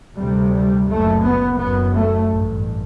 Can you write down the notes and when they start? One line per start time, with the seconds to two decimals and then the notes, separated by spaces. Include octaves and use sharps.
0.17 D2 C3 G3
0.53 G3
0.88 F#1 F#2 A3
1.23 B3
1.59 F#1 F#2 B3
1.94 A3
2.29 A1 G2